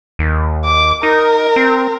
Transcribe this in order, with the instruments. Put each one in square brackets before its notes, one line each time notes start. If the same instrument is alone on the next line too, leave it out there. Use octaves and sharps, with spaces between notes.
[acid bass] D#2
[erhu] D6
[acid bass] D#4 [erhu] A#4
[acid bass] C4